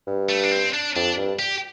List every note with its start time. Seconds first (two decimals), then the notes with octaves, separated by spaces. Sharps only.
0.07 G2
0.29 A3
0.43 D4
0.52 C4
0.74 D4
0.96 F2 D4
1.17 G2
1.39 G4